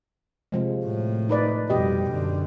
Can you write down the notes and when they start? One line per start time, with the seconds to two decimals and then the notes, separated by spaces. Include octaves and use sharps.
0.52 C3 F3 G#3
0.85 A2
1.29 D#4 B4 D5
1.70 F2 B2 G3 G4 D#5
2.11 F#2 D3